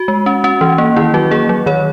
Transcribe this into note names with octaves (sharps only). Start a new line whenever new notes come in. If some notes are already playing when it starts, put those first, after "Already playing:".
Already playing: F#4
G#3
C#4
C#4
E3
A#3
D#3 E4
F#3 F#4
A#3 G#4
F#3
D#3 C#5